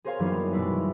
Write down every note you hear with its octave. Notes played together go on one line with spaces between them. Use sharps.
G#4 A#4 C5 C#5 F5 G#5
F#2 E3 G3 A#3 B3 D#4
B2 G3 G#3 E4 B4